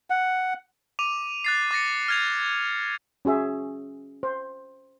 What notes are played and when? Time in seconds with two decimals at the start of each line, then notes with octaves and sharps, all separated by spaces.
0.10 F#5
0.99 D6 D#7 F7
1.44 F#6 A6 C7
1.71 D6 A6 A#6 C#7
2.08 F6 G#6 F7
3.25 C#4 F#4 G#4 E5
4.23 C5